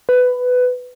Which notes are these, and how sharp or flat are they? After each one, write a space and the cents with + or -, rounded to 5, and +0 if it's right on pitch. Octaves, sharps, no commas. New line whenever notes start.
B4 +15